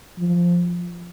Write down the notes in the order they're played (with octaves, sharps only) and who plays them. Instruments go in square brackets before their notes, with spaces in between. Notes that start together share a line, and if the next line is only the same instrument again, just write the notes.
[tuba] F3